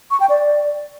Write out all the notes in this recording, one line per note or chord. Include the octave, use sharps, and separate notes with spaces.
C#6
G5
D5